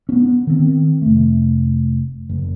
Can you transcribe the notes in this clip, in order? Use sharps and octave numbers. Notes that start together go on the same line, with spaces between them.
B3 C#4
D#3 C4
F1 A3
F#1